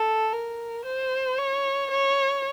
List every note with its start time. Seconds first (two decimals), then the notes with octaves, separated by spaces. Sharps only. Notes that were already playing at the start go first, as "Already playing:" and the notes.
Already playing: A4
0.33 A#4
0.85 C5
1.38 C#5
1.91 C#5